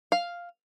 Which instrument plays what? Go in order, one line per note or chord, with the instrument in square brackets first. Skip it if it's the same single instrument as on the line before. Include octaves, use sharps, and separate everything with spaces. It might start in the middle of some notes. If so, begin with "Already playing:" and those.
[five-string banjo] F5